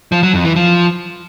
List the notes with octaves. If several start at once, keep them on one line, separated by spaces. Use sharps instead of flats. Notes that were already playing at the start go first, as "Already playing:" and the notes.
F3
F#3
F2
E3
F3